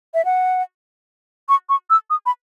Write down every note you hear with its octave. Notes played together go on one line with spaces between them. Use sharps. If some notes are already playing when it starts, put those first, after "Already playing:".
E5
F#5
C#6
C#6
E6
D#6
B5